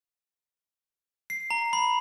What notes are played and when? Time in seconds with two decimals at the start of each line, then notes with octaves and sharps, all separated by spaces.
1.30 C7
1.50 A#5
1.73 B5